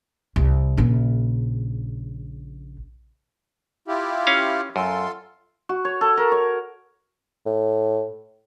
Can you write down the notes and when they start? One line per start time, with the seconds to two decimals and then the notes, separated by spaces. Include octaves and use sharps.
0.36 C2
0.77 A#1 C#3
3.88 E4 F4 G4
4.27 C#4 F5
4.76 F#2 F4 A4 C6
5.69 F#4
5.85 C#5
6.01 A4
6.17 A#4
6.32 C#5
7.46 A2